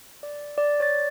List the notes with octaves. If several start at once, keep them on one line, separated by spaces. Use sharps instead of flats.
D5
D5
C#5 D5 A6